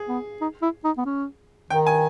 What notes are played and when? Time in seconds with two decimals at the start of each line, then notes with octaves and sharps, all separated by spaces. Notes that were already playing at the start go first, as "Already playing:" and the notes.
Already playing: G#4
0.08 B3
0.41 D#4
0.62 E4
0.84 D#4
0.98 B3
1.06 C#4
1.70 D#3 G5
1.87 G#5